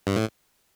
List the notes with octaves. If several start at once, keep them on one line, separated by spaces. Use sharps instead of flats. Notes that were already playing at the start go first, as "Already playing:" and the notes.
G2
A2